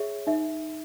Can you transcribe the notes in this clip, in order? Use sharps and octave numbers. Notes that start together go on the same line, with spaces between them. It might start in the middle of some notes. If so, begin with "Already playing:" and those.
Already playing: G#4 C#5 E5
D#4 E5